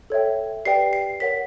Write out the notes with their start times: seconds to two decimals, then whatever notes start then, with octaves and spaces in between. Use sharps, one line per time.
0.10 A4 C#5 E5 G5
0.65 G4 B4 D5 G5 C7
0.93 C7
1.20 A#4 C#5 F#5 B6